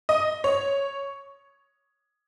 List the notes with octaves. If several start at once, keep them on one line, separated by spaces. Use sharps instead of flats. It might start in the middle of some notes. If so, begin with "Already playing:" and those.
D#5
C#5